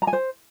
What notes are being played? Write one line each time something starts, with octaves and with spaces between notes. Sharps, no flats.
A#5
G#5
C5